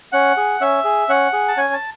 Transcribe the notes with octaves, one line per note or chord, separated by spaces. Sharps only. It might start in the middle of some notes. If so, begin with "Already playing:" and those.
C#4 F#5
G#4
C#4 E5
G#4
C#4 F#5
G#4
A5
C#4 G#5
A5